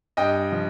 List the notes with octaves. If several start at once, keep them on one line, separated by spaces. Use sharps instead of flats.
G2 D#5 G5
F3